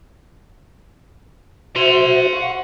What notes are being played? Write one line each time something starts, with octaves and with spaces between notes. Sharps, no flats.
F#4 C5 E5 F#5 C6
F5 C#6